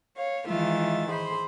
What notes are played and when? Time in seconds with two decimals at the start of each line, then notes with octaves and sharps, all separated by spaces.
0.17 C#5 F5
0.48 D#3 E3 G#3 F4 E5 A6
1.09 G#4 C5 B5 C6